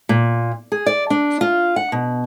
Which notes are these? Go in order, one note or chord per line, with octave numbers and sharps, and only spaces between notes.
A#2
G#4
D5
D4
F4
F#5
B2